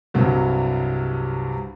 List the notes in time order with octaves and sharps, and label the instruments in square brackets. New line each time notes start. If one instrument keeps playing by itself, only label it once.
[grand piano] C2 G2 C3 F#3